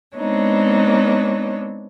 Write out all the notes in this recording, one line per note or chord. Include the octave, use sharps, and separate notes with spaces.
G#3 B3 C4 D4 D#4 C#5